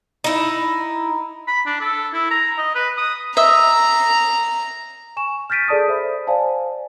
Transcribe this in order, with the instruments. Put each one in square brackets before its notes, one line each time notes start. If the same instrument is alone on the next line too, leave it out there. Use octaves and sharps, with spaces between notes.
[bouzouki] D#4 E4
[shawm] B5
D4
A4
E4
A#5
D#5
B4
D#6
[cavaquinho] D#5 E5 [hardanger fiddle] A#5
[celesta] G#5 C#6 E7
F6 G6 A6 B6 D7 D#7
G#4 A4 D5 A5 D#6
C5 E5 B5
C5 D5 F5 G#5 A5